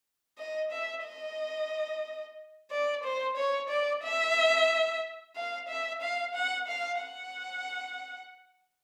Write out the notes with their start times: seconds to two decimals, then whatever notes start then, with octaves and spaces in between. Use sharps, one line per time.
0.38 D#5
0.71 E5
1.06 D#5
2.71 D5
3.04 C5
3.37 C#5
3.70 D5
4.04 E5
5.35 F5
5.69 E5
6.02 F5
6.35 F#5
6.68 F5
7.01 F#5